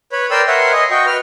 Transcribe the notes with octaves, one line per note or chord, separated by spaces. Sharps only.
B4 C#5 B5
A#4 B4 D5 G5 C6 E6
A#4 B4 C#5 E5 F#5 C6
D#5 G#5 C6
F#4 D#5 G5 C#6
B4 F6